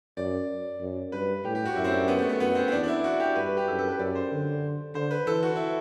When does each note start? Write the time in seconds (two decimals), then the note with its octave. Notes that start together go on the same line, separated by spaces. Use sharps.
0.17 F#2 D5
0.80 F#2
1.12 G2 B4
1.45 A2 G4
1.55 G4
1.65 F#4
1.76 F#2 E4
1.84 C4
1.92 D4
2.08 B3
2.19 A3
2.29 A3
2.40 F#2 B3
2.55 C4
2.68 C4
2.72 E2 D4
2.83 D4
2.88 E4
3.04 F#4
3.20 G4
3.35 G2 B4
3.46 B4
3.57 G4
3.67 F#2 A4
3.79 A4
3.89 B4
3.99 F#2 D5
4.15 C5
4.32 D3
4.95 D3 C5
5.11 B4
5.26 E3 A4
5.42 F#4
5.56 E4